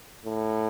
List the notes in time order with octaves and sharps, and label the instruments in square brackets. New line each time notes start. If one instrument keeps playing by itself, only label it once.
[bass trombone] A2